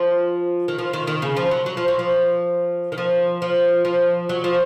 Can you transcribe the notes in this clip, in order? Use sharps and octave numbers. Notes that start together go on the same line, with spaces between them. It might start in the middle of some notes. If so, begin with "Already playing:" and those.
Already playing: F3
D#3
F3
D#3
D#3
C#3
F3
F#3
F#3
F3
F#3
F3
D#3
F3
F3
F3
F#3
F3